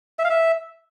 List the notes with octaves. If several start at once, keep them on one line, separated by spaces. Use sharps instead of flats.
E5
F5
E5